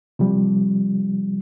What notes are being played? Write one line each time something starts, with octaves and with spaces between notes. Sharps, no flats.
C3 F3 G3